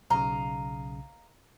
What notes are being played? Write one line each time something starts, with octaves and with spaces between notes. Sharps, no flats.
B1 C#3 D#5 F5 A#5